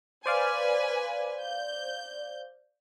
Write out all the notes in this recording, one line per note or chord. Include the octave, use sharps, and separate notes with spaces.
B4 C5 D5 F5 G#5
G6